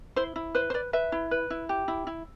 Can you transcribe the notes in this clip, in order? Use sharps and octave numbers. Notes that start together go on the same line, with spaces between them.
E4 C5
E4
B4 C5
C5
B4 D5
B4 E5
E4
B4
E4
G4
E4
E4